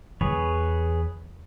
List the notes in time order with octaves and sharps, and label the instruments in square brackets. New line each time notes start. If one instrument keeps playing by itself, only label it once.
[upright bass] E2 [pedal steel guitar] G#4 B4 C#5